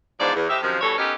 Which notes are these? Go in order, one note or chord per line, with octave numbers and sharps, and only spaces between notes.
E2 G#2 F3 D4 D5
E2
A2 G4 C5 D#5 E5
F#2 C3 D#3 F3
B2 E3 G3 A4 C#5
B3 C#4 D#4 G4 A4 A#4